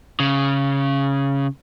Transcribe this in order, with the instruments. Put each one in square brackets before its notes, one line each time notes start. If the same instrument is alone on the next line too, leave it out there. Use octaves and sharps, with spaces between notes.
[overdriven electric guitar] C#3